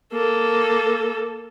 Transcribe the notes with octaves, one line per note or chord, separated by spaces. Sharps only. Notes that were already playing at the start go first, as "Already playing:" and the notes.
A#3 A4